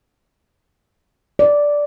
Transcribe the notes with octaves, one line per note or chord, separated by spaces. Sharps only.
D5